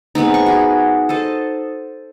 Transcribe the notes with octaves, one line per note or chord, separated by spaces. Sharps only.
G#3 B3 C4 D#4
C#6
F#4 G#4
A4 C5 D#5 A5